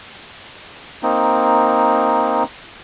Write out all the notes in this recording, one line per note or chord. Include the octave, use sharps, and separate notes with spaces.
A#3 C4 D#4